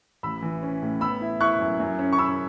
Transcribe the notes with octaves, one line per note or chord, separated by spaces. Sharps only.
A1 B5 E6
E3
C#4
A2
B3 B5 E6
E4
E4 C#6 F#6
F#2
F#2
C#4
C#6
C#4 B5 E6